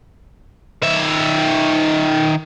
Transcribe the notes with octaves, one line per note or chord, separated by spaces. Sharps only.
D#3 E5